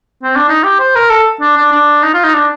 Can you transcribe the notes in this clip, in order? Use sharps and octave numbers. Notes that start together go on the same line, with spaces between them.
C4
D4
D#4
G4
C5
A#4
A4
D4
D4
D4
D#4
F4
D#4
D4